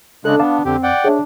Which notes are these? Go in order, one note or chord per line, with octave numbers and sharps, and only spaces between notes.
C#3 G#3 D4 A4 F#6
B3 F5 A5 D6
F2 D3 C4 G4
D5 F#5 G5
D4 G#4 C#5 E5